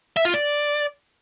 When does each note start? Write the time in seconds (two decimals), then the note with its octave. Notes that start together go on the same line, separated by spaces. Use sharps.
0.17 E5
0.25 F4
0.34 D5